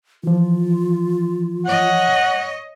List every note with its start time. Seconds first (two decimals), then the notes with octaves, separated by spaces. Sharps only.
0.24 E3 F3 F4
1.66 C#5 D#5 F#5